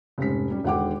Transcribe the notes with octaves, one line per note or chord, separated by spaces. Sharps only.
F1 G#2 C#4 B6
G3 C#4
E1 D3 D#3 F#5 G5 D6